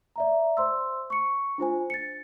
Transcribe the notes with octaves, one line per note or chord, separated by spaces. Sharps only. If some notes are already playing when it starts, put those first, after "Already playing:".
D5 E5 A#5
C5 C6 E6
C#6 C#7
D4 F4 C5 G#5
A6 C#7